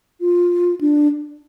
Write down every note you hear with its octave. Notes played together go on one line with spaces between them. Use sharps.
F4
D4